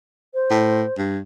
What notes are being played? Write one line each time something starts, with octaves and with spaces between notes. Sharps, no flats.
C5
A2
G2